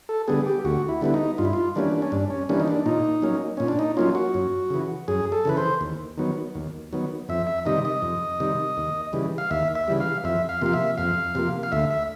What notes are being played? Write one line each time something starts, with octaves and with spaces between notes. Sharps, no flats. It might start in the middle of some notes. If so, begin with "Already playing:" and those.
A4
D3 G3 B3 G#4
G4
D2 F#4
E4
D3 G3 B3 E4
D#4
G2 F4
E4
F4
E3 G3 A#3 C#4 D4
C#4
G2 D4
C#4
E3 G3 A#3 C#4 D4
D#4
D4
A#2 D#4
F#3 A#3 C#4
A#2 C#4
D4
D#4
F#3 A#3 C#4 F4
F#4
F#2
C#3 E3
F#2 G#4
A4
C#3 E3 B4
C5
D#2
D#3 F#3 B3
D#2
D#3 F#3 B3
F2 E5
E5
C3 D#3 G3 D#5
D#5
F2
C3 D#3 G3
D#2
C#3 E3 G3
F5
D#2 E5
E5
C#3 E3 G3
F5
F2 E5
F5
C3 F3 A#3 F5
E5
F2 F5
C3 F3 A#3
F5
D2 E5
E5